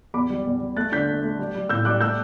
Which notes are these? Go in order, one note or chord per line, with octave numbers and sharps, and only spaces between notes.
E2 B5 D6
G3
E2
G3
A3 F#6 A6
D3 G6 B6
A3
A3
G3
G3
A2 E6 G6
G3 D6 F#6
A3 E6 G6